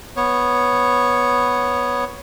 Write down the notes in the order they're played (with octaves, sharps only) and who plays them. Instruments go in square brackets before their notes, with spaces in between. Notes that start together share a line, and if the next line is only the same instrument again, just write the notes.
[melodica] B3 C#5